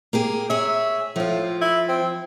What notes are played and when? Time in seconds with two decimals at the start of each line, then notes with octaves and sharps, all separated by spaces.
0.13 A#3 G4 G#4
0.50 G#4 C#5 E5
1.16 A2 F3 F4
1.61 E4
1.89 C4